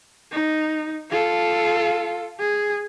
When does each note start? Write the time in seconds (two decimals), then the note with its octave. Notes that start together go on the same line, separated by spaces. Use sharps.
0.32 D#4
1.11 F4 A4
2.39 G#4